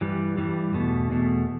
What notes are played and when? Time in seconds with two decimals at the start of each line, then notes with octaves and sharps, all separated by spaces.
0.01 G2 E3 G3
0.37 G2 E3 G3
0.74 E2 B2 A3
1.10 E2 B2 A3